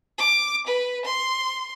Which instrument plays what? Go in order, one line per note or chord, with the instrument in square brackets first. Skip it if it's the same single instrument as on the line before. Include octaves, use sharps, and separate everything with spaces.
[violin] D6
B4
C6